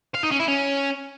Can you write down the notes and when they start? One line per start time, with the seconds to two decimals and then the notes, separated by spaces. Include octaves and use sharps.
0.15 F5
0.23 D#4
0.31 C#4
0.40 E4
0.48 C#4